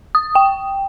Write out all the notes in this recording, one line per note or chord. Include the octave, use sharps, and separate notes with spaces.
D#6
G5